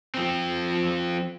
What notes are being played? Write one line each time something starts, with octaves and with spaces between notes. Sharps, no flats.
F3 C4